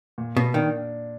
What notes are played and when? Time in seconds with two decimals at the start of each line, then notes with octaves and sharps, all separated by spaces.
0.18 A#2
0.37 B2
0.54 D#3 D4